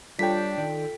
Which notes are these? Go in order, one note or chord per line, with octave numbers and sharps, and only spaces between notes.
G3 D4 F4 A4 C#5 G5 B6
D#3 D5